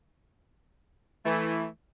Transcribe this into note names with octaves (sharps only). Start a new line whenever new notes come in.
E3 A3